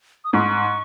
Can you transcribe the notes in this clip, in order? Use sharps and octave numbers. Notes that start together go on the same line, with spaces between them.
D#6
G#2 C#6